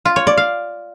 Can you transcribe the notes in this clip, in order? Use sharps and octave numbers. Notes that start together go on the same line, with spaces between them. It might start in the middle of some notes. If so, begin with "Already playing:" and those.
F4
C#5
D5
F5